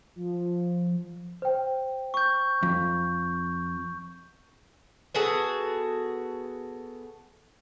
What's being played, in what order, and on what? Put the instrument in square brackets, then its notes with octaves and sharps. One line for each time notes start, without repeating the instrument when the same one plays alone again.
[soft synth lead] F3
[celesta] C5 G5
[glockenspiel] C#6 G6
[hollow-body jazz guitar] F2
[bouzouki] B3 F#4 G#4 A4